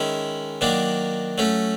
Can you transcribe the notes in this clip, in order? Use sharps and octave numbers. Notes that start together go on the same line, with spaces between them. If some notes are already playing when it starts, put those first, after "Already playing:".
Already playing: D#3 G#3 C#4 E4
D#3 F#3 A#3 D4
F#3 A3 C#4